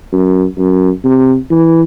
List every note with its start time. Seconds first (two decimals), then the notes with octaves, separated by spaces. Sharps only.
0.12 F#2
0.58 F#2
1.04 C3
1.50 E3